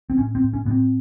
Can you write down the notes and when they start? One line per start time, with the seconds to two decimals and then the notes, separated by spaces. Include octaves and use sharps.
0.10 C4
0.18 A2 C#4
0.35 C4
0.42 A2
0.53 C#4
0.65 A2 B3
0.71 C4